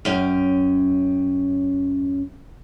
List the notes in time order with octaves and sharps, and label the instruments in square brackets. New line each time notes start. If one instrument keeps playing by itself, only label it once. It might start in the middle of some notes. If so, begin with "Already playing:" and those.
[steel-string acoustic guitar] F#2 C#4 G5